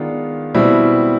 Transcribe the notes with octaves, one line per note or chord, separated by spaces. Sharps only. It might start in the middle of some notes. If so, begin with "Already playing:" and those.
Already playing: D#3 G#3 B3 D4 F4
B2 G3 C4 E4